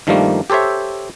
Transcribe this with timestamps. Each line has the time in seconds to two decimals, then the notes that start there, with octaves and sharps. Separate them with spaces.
0.07 G2 D#3 F3 G3 A3 A#3
0.50 G4 A4 C5 C#5 E5